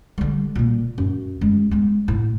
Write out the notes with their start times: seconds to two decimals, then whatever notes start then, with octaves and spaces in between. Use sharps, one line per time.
0.18 D3 G3
0.55 A#2 A#3
0.98 F#2
1.41 F#2 G#3
1.71 G#3 B3
2.08 A2